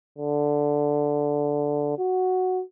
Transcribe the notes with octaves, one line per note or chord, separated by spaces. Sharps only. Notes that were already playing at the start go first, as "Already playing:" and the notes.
D3
F#4